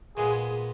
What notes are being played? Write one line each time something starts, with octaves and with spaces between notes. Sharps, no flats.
A#2 G#3 B3 G#4